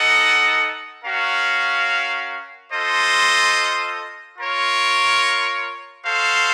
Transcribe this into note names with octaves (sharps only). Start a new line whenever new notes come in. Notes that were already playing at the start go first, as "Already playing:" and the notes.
Already playing: D#4 A4 D#5 F#5
C#4 F#4 A#4 F5
F4 A4 C5 D#5
F4 A#4 C#5
F#4 A4 C5 F5